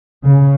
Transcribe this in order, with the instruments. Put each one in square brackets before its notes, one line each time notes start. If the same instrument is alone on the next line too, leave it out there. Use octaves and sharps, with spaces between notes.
[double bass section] C#3